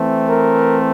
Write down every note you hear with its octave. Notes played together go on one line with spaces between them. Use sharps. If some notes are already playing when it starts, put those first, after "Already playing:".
Already playing: E3 A3 C4
A#4